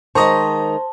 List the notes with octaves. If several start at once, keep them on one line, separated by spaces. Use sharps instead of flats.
D#3 G#3 C5 D#5 A5 A#5 C#6